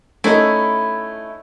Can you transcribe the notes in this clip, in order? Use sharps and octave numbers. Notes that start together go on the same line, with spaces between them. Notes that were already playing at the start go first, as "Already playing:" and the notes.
A3 C#4 D#4 E4